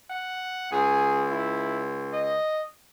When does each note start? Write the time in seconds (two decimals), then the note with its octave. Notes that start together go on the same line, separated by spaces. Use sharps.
0.10 F#5
0.72 C#2 G#4
1.31 E4
2.13 D#5